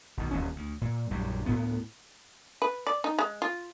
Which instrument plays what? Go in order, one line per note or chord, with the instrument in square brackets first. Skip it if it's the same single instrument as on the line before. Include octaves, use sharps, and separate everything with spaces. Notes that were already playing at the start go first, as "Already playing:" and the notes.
[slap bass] B1 B2 D#3
D#1 D#2 C#4
D2
A#2
A#1 F#2 F#3 G3
D2 A2 A#3 B3
[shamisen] B4
D5
D#4
G#3
F4